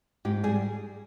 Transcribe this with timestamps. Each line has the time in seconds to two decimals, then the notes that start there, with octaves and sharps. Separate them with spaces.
0.25 G#2 G4
0.44 G3 G#4